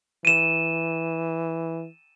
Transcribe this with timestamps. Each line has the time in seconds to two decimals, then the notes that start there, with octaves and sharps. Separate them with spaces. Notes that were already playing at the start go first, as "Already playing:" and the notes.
0.25 E3 D#7 E7